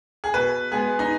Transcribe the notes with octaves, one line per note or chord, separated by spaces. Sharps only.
G#4
B2 B4
G#3 B3 G#4
D#4